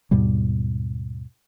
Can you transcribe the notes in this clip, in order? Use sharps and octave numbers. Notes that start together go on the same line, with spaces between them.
D#2 G#2 B2 G3